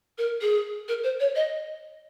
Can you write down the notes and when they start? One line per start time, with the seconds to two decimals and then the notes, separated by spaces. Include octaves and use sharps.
0.18 A#4
0.42 G#4
0.88 A#4
1.04 C5
1.20 C#5
1.36 D#5